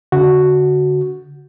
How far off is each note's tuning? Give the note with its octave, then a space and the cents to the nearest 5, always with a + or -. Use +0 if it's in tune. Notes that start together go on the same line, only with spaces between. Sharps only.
D3 -40 F#4 +0